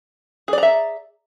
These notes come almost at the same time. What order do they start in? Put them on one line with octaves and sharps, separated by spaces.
G#4 D5 A#5 E5